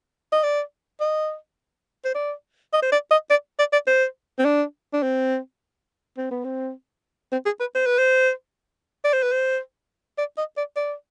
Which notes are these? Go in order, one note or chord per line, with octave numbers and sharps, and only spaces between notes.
D#5
D5
D#5
C5
D5
D#5
C5
D5
D#5
D5
D5
D5
C5
C4
D4
D4
C4
C4
B3
C4
C4
G#4
B4
C5
B4
C5
D5
C5
B4
C5
D5
D#5
D5
D5